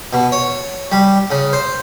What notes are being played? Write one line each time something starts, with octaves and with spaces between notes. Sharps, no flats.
B2
C#5
G3
C#3
C5